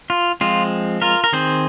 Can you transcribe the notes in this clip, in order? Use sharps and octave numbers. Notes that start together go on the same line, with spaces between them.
F4
F3 G#3 C4 F4
F4 A#4
A#4
D#3 C4 G#4 C5